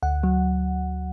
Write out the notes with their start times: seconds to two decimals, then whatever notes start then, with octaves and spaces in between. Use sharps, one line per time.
0.03 D2 F#5
0.23 F#3